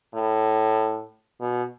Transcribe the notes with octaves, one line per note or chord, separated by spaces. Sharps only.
A2
B2